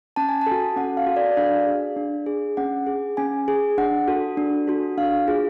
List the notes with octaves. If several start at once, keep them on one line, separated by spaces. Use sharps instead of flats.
C#4 A5
G#5
A5
F#4 A4
C#4 F#5
F5
F#4 A4
D5
D5
D4 F5
G#4
D4
G#4
C#4 F#5
G#4
C#4 G#5
G#4
D4 F#5
F#4 A4
D4
F#4 A4
D4 F5
F4 G#4